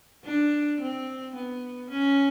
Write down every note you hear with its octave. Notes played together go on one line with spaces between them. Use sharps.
D4
C4
B3
C#4